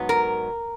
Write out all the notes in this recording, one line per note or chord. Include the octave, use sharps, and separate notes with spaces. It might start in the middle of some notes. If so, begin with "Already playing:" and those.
Already playing: G#2 F#3 B3
A#4